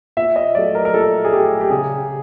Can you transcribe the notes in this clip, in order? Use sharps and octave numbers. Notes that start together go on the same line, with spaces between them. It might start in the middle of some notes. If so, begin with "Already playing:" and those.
A#2 E5
D#5
F#3 A3 D5
A#4
A#4
A#2 A4
G#4
F#3 A3 G4
G4
C#3 G#4